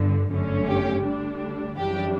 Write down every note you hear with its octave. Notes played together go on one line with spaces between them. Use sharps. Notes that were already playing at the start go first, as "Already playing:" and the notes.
Already playing: G1 G2 D3
G1 F#2 D3 A3 C#4
G4
D2 D3 G3 D4
F#2 C#3 E3 G3 D4 G4